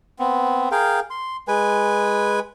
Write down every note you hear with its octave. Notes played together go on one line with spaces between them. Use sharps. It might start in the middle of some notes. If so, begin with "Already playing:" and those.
B3 C4
G#4 A#4 F5 G5
C6
G#3 B4 G#5